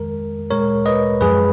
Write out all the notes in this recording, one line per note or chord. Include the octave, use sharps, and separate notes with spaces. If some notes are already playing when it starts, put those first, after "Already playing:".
Already playing: F2 D#3 G#3 A#4
A#2 G#3 A#4 C#5
B4 D#5
F#2 F3 G#3 G#4 B4